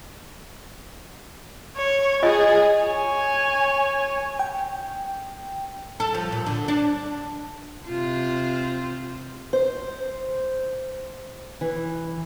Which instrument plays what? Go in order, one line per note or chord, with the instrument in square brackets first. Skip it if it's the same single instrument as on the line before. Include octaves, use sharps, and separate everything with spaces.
[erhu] C#5
[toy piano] F4 D#5 [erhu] G#4
[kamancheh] C#5 G#5
[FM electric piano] G5
[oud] A4
F3
A#2
D3
D4
[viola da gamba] C3 F4 C5
[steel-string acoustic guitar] C5
E3